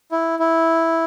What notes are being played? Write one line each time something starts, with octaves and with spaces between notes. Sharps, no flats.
E4
E4